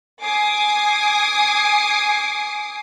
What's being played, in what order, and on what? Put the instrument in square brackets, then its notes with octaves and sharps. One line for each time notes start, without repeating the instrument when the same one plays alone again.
[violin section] G#5 D6 D#6 C7